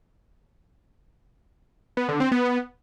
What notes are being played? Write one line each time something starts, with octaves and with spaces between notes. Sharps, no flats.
B3
D3
C4
B3